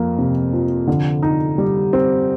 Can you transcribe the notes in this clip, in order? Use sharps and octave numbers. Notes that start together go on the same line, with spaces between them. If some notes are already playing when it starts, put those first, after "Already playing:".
Already playing: F2 A#3
C3
F3
D3
D#4
G3
C4